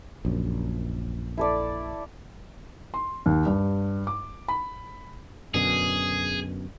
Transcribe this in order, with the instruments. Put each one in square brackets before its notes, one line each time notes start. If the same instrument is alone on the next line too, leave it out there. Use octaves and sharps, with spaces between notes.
[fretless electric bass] A#1 F#2
[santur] E4 A4 D5
[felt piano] C6
D#2
G2
D6
B5
[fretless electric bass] F#2 B2 D3 [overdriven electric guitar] G#4